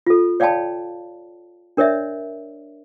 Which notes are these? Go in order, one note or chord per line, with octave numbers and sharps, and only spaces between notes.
F4 A4
C#5 D5 F5 G5 A5 B5
D4 A#4 C#5 D5 E5